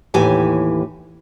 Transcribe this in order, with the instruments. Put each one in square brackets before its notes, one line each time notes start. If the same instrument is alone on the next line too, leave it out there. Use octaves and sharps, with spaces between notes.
[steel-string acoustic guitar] D#2 A2 E3 G4 G#5